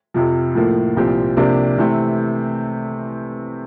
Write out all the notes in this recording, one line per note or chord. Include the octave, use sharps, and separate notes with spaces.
F2 C3 F3
A2 F3 A#3
C2 A#2 F3 C4 G4
C3 F3 A#3 D4 G4
C3 E3 A3 C4